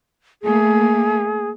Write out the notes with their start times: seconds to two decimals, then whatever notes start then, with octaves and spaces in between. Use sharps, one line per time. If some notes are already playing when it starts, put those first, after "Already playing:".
0.43 A3 A#3 G#4